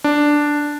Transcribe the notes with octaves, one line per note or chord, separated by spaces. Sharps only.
D4